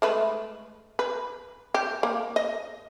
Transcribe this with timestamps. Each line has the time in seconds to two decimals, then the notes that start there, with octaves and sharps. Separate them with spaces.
0.02 G#3 A3 B4
0.99 B4
1.74 G4
2.03 A#3
2.36 D#5